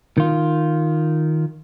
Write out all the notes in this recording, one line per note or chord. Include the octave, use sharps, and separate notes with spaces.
D#3 F4